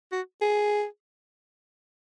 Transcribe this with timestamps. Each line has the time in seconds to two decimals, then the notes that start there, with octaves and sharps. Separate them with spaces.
0.12 F#4
0.41 G#4